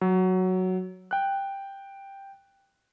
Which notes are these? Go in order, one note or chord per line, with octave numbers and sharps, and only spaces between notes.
F#3
G5 F#6